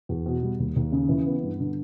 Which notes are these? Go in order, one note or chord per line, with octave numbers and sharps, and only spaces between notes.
E2
B2
G3
D#2
D#2
C#3
E3
B3
G2
D3